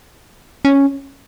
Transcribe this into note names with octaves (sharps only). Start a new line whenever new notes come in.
C#4